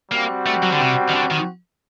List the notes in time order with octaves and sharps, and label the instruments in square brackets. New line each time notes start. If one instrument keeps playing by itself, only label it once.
[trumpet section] G3 C4 F#4 [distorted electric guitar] A#3
[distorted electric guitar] A3
F#3
D3
C3
D#3
D3
D#3